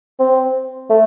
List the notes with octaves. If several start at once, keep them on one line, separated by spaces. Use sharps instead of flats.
C4
A3